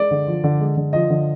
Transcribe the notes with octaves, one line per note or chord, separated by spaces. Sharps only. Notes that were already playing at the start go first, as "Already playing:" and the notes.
Already playing: G#3 D5
D3
F3
D3
G#3
D3
F3 D#5
D3